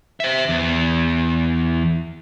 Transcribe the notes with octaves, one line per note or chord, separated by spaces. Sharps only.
C5 E5
E2